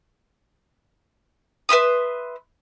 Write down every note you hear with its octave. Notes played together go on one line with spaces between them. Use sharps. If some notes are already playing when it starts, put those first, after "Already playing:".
B4 E5 C6 D#6